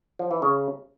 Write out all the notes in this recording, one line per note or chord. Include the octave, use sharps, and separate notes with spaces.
F3
E3
C#3